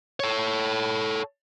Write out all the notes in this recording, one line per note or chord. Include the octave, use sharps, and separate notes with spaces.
A4 C#5